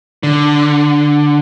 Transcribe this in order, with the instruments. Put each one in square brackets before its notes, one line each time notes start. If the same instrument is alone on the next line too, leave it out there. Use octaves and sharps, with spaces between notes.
[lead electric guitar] D3